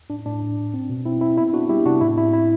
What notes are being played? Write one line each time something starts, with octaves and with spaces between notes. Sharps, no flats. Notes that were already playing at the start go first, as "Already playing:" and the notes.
A2 D4
A2 D4
A2
A2
C4
B2
C4 E4
C4 E4
B3 E4
B3 D4 F#4
G3 E4 G4
C3 D4 F#4
A2 E4
C4 E4
C4 E4